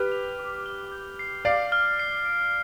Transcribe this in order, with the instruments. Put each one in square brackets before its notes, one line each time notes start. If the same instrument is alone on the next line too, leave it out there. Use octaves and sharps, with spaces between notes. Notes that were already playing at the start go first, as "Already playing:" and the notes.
Already playing: [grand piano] G4 B4 [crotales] F6
[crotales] F7
D6
G7
G6
C7
[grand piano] D5 F5 [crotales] C7
[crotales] F6
C7
D7